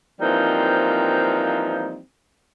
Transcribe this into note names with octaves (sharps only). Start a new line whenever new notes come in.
E3 F3 G3 A#3 C4 D#4